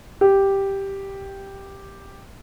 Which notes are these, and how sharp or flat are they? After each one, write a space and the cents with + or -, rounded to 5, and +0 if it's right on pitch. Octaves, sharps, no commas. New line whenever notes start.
G4 +0